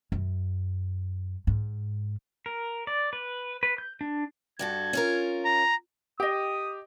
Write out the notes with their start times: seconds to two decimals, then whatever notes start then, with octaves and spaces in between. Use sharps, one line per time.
0.12 F#2
1.47 G#2
2.46 A#4
2.87 D5
3.13 B4
3.63 B4
3.78 G6
4.01 D4
4.59 G2 F#4 A4 G#6
4.93 C#4 F4 A#4
5.45 A#5
6.20 G4 D#5 G5 D#6